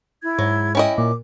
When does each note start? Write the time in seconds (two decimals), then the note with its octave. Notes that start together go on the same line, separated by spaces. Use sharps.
0.23 E4 G#6
0.39 G#2 F#3
0.75 C#4 E4 D#5 G5
0.98 A#2 D6